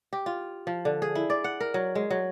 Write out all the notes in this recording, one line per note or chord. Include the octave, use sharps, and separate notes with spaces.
G4
F4
F3
D3
G#4
E4
D5
F#5
A#4
F#3
G#3
F#3